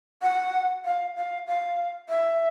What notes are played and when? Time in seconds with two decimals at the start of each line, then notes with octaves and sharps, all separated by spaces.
0.22 F#5
0.85 F5
1.16 F5
1.47 F5
2.09 E5